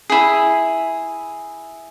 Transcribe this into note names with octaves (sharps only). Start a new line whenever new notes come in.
E4 G#4